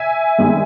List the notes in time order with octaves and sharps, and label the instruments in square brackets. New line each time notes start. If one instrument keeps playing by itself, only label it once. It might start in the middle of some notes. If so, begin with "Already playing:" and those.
Already playing: [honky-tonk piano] E5 G#5
G2 D#3 G#3